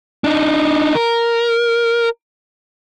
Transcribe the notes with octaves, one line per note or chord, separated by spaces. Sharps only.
D4 D#4
A#4